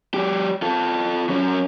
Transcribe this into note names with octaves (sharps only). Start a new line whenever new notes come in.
F#3 G4
F4 A4
F#3 C#4